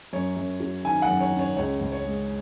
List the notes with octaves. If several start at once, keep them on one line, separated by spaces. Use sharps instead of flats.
F#2 C#5
F#2
F#3
D#3 G#5
F#5
F#2
C#5
F#2
C#5
C#2 C#5
C#2
C#5
G#3